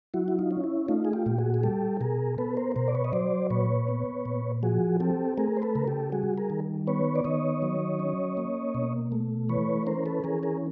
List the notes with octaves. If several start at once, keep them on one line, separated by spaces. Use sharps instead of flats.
F#3 E4 F#4
E4
D#4 F4
C#4
E4
A3 D#4 F4
G#4
F4 G4
A#2 G4
F#4 G#4
G#4
G3 G4 A4
B2 G#4 A#4
B3 A4 B4
A#4 C5
B2 A#4 C5
D5
B4 C#5
D#5
F#3 C5 D5
A#2 B4 C#5
B3
A#2
F3 F#4 G#4
C4 G4 A4
A3 G#4 A#4
C5
A4 B4
C#3 A#4
G4 A4
G3 F#4 G#4
G#4 A#4
D#3
B3 B4 C#5
D5
D#3 C#5 D#5
F#3
C#4
A#3
B2
A3
E3 B4 C#5
C#4 A#4 C5
A4 B4
E3 G#4 A#4
G#4 A#4